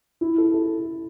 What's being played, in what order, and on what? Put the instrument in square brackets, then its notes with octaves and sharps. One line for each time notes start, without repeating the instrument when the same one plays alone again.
[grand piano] E4
A4
A4